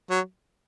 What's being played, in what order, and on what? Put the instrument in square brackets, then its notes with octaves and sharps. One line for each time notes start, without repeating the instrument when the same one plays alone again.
[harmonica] F#3